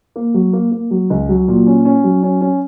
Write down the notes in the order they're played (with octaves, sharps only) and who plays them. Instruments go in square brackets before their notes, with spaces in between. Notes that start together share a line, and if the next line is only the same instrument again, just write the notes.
[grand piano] A#3
F#3
A#3
A#3
F#3
C#2
F#3
A#2
C#4
C#4
F#3
C#4
C#4